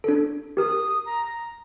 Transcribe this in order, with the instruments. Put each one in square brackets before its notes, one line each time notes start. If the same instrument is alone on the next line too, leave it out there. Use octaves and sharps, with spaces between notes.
[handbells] D4 A4
[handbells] G4 A#4 [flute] D#6
[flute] A#5